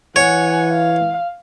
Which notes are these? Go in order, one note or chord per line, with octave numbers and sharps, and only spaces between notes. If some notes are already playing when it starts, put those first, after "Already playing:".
E3 C#5 F#5 G#5
F5